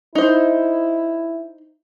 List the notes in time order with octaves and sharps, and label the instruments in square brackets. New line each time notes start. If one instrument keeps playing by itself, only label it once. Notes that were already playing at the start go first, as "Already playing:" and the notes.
[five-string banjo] D#4 C5 [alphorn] E4